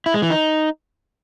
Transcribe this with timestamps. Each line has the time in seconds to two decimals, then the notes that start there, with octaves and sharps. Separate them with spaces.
0.06 E4
0.14 G#3
0.22 E3
0.30 D#4